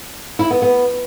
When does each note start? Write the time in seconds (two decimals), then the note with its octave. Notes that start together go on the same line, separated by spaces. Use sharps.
0.39 E4
0.50 B3
0.62 B3